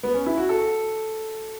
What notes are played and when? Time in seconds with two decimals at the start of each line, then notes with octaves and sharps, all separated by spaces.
0.03 B3
0.14 C#4
0.26 E4
0.38 F#4
0.49 A4